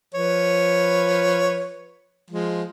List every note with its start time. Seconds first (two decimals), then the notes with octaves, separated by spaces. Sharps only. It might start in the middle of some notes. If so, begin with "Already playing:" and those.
0.14 F3 B4 C#5
2.30 F3 G#3